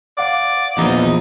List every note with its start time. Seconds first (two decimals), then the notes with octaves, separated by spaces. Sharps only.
0.17 D5 F5 F#5 D6
0.78 A#1 E2 D#4